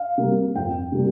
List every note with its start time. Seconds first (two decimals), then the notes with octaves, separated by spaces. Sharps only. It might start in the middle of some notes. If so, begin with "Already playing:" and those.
Already playing: F5
0.18 C3 G3 A#3
0.56 F2 G5
0.92 C3 G3 A#3